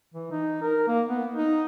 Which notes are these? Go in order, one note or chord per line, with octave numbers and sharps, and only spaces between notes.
E3
D#4
A#4
A#3
B3
D#4